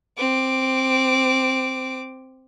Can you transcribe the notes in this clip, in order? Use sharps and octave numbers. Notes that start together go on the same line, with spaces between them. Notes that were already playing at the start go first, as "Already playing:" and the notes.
C4 D6